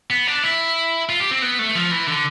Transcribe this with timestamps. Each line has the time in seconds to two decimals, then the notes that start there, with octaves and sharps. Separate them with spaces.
0.10 B3
0.27 D4
0.43 E4
1.09 F4
1.20 G4
1.31 C4
1.42 B3
1.59 A3
1.76 F3
1.91 E3
2.08 D3